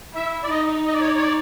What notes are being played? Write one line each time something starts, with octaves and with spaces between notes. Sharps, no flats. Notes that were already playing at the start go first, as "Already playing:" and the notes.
E4 E5
D5
D#4 D#5
D#5
D5
C#5
D5
C#5
D5